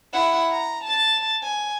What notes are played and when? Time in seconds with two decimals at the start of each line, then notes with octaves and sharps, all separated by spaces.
0.14 E4 F#5
0.51 A#5
0.83 A5 A6
1.43 G#5